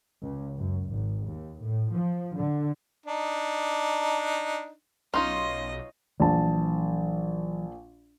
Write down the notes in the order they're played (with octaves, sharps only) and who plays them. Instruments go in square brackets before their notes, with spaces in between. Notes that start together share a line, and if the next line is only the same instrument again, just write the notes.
[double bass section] C#2
F#2
G#1
D#2
A2
F3
D3
[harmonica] D4 D#4
[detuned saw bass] B1 [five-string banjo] C#4 D#4 F4 [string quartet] D#5 [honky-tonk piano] C6
[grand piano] A#1 A5 [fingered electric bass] E3 F#3